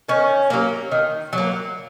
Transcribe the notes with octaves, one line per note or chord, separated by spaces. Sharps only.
D#3 C#4
F#3 A#3
D#3
F#3 A#3